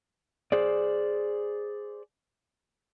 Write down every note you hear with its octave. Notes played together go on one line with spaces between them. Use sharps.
G#4 C5 D5